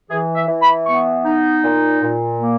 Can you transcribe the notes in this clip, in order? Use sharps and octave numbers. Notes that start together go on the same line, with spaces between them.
E3 G#4
E5
E3
B5
B3 C#6
D#4
A#2
A#2
A#3